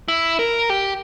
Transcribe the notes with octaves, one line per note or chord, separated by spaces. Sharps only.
E4
A#4
G4